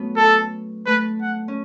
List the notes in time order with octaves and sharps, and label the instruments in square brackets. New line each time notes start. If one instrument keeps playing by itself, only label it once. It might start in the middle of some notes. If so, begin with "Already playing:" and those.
Already playing: [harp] F#3 A3 B3 C#4
[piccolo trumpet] A4
[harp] A3 [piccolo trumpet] B4
[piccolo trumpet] F#5
[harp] C#4